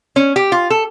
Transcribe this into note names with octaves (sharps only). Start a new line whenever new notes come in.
C#4
G4
F4
A4